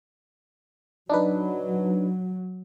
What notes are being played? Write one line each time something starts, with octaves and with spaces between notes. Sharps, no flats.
F#3 D4 D#4 B4